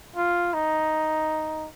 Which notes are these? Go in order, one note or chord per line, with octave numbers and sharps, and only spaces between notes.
F4
D#4